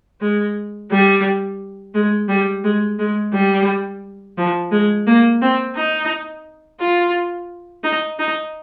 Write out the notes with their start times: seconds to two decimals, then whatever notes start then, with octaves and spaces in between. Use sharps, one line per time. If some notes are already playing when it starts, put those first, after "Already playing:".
0.21 G#3
0.91 G3
1.94 G#3
2.29 G3
2.64 G#3
2.99 G#3
3.34 G3
4.38 F3
4.71 G#3
5.07 A#3
5.42 C4
5.76 D#4
6.80 F4
7.84 D#4
8.19 D#4